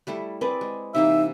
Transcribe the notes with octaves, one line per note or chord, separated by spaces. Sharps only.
G3 A3 E4
C4 G#4 B4 D5
G#3
C3 E3 A#3 D#4 E5